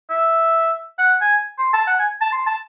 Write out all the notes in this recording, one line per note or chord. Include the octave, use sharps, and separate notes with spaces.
E5
F#5
G#5
C6
A5
F#5
G#5
A5
C6
A5